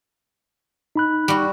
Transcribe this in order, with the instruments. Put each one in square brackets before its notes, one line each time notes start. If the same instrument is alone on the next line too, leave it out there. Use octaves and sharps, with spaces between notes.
[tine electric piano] D#4 B5 F#6
[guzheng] G3 F#4